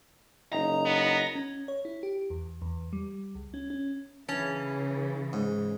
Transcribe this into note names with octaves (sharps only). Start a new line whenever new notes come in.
F#1 D#4 A#5
B3
C#4
C#5
E4
G4
E2
E2
G3
C#2
C#4
C#4
C#3 E3 C#4 A5
G#2